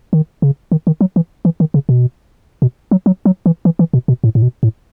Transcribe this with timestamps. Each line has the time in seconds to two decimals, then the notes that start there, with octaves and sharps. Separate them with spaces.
0.13 D#3
0.42 C#3
0.72 D#3
0.87 D#3
1.01 F#3
1.16 E3
1.45 E3
1.60 D#3
1.74 C#3
1.89 B2
2.62 B2
2.91 F#3
3.06 F#3
3.25 F#3
3.46 E3
3.65 E3
3.79 E3
3.94 B2
4.08 B2
4.24 A2
4.35 A2
4.42 B2
4.63 A2